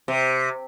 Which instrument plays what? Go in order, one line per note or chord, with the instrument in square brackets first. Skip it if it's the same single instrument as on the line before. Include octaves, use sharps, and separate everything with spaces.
[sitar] C3